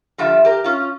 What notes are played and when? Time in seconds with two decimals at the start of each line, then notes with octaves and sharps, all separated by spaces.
0.18 D3 F3 G3 F4 E5
0.45 G4 A#4
0.64 C#4 F4